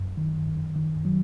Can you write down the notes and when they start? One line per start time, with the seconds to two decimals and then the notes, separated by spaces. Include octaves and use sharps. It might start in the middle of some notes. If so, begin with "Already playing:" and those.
Already playing: F#2
0.17 D#3
0.47 F#2
0.76 D#3
1.05 F#3